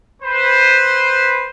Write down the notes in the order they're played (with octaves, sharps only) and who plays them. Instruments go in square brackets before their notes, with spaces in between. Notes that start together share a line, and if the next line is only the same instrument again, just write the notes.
[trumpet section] B4 C5